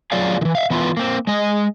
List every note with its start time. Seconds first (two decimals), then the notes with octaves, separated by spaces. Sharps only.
0.12 F#3 F4 G#4 D5 F5
0.41 D#3 E3
0.55 E5 F5
0.70 E3 B3 E4 F4
0.97 A#3 C4
1.27 G#3 D#5